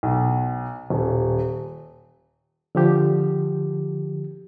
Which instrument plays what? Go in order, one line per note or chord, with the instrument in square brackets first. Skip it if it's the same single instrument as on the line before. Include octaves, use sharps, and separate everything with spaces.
[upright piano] B1
D#1
[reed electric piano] D3 F3 G4